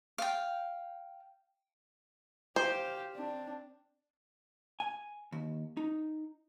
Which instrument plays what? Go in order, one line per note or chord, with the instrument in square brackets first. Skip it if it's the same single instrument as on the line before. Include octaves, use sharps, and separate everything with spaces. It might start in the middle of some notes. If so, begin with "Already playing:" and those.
[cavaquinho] F5 G5
[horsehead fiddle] G4 F5 [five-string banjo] C5
[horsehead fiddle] C4 D4
[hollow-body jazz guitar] G#5
D#2
D#4